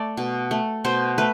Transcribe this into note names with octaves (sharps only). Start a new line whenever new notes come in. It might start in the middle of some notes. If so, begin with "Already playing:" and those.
Already playing: A3 D5
B2
A3
B2 C5
A3 B4